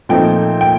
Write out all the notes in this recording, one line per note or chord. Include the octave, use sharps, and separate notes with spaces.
A#2 F3 A3 C4 D#4 G5
G5